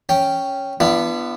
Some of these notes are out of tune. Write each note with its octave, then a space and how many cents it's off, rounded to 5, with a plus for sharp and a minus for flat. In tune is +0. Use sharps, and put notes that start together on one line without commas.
C#4 +0 G5 +0
B3 +0 D4 +10 F4 -45